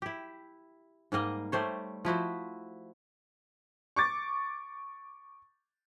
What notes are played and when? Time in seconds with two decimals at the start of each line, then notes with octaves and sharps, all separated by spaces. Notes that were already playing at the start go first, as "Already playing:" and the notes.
0.02 E4 G4
1.12 G#2 G3 A#3 D#5
1.52 G3 A3 C5 C#5
2.05 F3 E4 F#4 C5
3.96 C#6 D6 A6